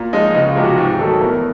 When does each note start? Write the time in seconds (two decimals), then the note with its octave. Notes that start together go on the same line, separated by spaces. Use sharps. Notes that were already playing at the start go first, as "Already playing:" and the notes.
Already playing: A#2
0.13 F3 G#3 D#4
0.34 C#2 D#4
0.48 F4
0.56 C3 F3 G#3
0.64 F#4
0.78 G#2 G4
0.99 D#3 F#3 A3 A4
1.21 E2 A#4